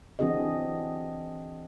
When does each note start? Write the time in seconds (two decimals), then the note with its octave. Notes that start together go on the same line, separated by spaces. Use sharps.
0.19 E3 C4 D4 F#4 G#4 D#5